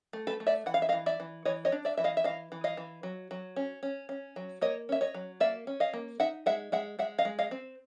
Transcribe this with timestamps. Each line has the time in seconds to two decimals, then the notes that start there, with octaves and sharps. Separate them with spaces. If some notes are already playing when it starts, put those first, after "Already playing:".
0.13 A3
0.27 A4 B4
0.40 A3
0.47 D5 E5
0.66 E3 F#5
0.74 F5
0.82 E5
0.89 D#5 F5
0.93 E3
1.06 D5 E5
1.20 E3
1.45 E3 C#5 D#5
1.65 C#5 D#5
1.72 D4
1.85 D5 E5
1.97 E3 E5
2.04 D#5 F5
2.17 E5
2.24 E3 D#5 F5
2.52 E3
2.64 D#5 F5
2.77 E3
3.03 F#3
3.31 F#3
3.56 C#4
3.83 C#4
4.09 C#4
4.36 F#3
4.61 A#3 C#5 D#5
4.89 C#4 E5
5.01 C#5 D#5
5.14 F#3
5.40 A#3 D5 E5
5.67 C#4
5.80 D#5 F5
5.94 A#3
6.20 D#4 E5 F#5
6.46 G#3 E5 F#5
6.72 G#3 E5 F#5
6.99 G#3 E5 F#5
7.18 D#5 F5
7.25 G#3
7.39 D#5 F5
7.51 C4